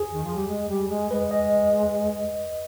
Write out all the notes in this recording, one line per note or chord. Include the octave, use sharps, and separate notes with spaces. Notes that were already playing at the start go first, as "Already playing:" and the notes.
Already playing: G#4
D#3
F3
G3
G#3
G3
G#3
G#3 B4
D#5